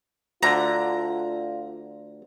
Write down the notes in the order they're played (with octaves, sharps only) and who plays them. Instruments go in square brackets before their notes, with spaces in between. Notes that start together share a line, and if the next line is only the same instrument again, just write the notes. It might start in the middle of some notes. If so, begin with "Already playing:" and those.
[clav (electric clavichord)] D2 D3 [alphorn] F4 [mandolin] A#5